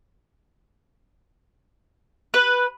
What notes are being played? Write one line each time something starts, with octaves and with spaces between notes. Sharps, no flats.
B4